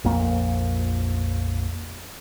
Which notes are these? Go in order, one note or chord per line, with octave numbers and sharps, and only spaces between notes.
A#1 F2 A#3